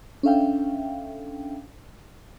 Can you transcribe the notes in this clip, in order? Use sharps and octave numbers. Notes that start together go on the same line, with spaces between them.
C#4 D4 A4 E5 F5 G5